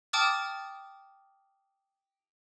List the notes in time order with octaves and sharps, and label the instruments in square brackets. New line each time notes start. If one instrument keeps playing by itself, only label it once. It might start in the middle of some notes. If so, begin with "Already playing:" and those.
[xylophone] G5 A5 D6 D#6 F6 A6